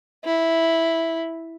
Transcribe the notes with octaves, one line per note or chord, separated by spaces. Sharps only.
E4